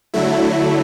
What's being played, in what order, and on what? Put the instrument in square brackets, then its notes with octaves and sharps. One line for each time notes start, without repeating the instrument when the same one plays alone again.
[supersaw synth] D3 F#3 A3 E4